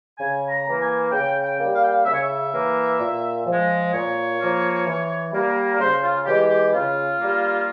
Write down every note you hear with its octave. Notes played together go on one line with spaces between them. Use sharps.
C#3 G#5
A#5
E3 A#3
G#5
C#3 G5
G5
G3 A#3
F5
G5
F5
C#3 E5
C#5
E5
E3 A#3
A#2
F3
G#3
A#2 C#5
F3 A#3
E3
G3 A#3
C#3 C5
F4
E3 G#3 G4
G4
C#3 F4
G3 A#3